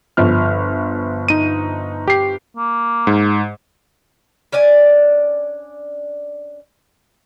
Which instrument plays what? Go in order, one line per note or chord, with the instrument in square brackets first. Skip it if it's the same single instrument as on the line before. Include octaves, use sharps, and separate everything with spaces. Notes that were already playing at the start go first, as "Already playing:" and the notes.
[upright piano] G1 F3 F6
[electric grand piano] D#4 D#7
G4 C7
[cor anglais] A#3
[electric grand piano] G#2
[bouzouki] C#4 D4 D5 G#5